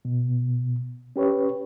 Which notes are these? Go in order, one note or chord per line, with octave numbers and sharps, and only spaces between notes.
B2
C#4 G4 B4 C#5